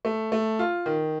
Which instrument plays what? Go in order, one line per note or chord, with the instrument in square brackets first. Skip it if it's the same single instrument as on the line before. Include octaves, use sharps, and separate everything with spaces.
[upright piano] A3
A3
F4
D#3